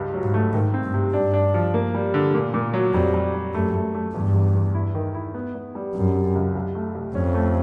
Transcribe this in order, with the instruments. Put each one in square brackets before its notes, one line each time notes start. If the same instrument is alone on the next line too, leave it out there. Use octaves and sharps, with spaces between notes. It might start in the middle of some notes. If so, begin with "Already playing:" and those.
Already playing: [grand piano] C#2 G2
F#3
[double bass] G#2
[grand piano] A3
[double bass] G#2 [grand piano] D#3
[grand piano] C4
[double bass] G2
[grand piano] C3
[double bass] G2 [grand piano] D4
[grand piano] D4
F3
A#3
G3
D3
A#2
A#2
F#3
[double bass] F2 [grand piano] G3
[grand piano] G3
G3
[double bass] F#2 [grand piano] A3
[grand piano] A3
A3
[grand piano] E2 [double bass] G2
[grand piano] E2
E2
E4
D#3
E4
B3
B3
G3
[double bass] F#2 [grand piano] C3
[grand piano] C3
C#2
C2
A3
C2
[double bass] F2 [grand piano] C#4
[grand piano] A3